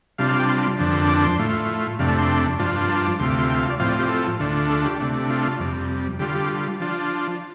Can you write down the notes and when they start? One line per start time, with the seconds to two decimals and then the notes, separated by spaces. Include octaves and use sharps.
0.18 C3 G3 D4 F4 F5
0.29 F5
0.40 G5
0.49 C6
0.64 C6
0.79 F2 D3 F3 D4
0.94 C6
1.09 D6
1.24 C6
1.39 A2 A3 F4
1.99 F2 C3 A3 D4 F5
2.09 A5
2.19 C6
2.59 G2 F3 D4 F4
2.89 A5
3.05 D6
3.19 D2 C3 A3 F4 C6
3.30 D6
3.39 C6
3.49 G5
3.60 F5
3.70 D5
3.79 A2 F3 C4 F4 F5
3.89 D5
3.99 G4
4.09 A4
4.39 D2 D3 A3 D4 F4
4.69 A4
4.84 G4
5.00 C3 A3 D4
5.30 F4
5.60 F2 C3 G3
6.19 D3 G3 F4 G4
6.35 G4
6.80 F3 D4 F4